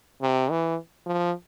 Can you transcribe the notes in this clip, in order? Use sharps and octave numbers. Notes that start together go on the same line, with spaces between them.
C3
E3
F3